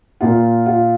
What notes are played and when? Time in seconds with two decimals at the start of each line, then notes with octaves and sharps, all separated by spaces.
0.21 A#2 A#3 F4
0.66 F4